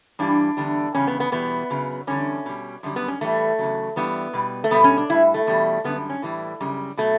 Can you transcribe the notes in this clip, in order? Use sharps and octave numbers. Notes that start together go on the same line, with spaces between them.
G2 E3 G3 D4
E2 D3 G3
E2 C#3 G3 C#4
B3
B3
E2 B2 G3 B3
F#2 C#3 F#3
E2 D3 G3 C#4
B2 G3
F#2 D3 G3
B3
C#4
A2 E3 G3 A3
E2 C#3 F#3
G2 E3 G3 B3
B2 G3
A3
B2 G3 B3
C#4
D4
A2 G3 E4
A3
E2 B2 G3
F#2 D3 G3 B3
C#4
A2 E3 G3
F#2 C#3 G3
B2 F#3 A3